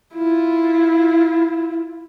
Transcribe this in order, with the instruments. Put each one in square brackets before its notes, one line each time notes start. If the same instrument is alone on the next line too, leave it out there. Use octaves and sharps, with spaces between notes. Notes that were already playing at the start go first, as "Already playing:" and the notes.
[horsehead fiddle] E4 F4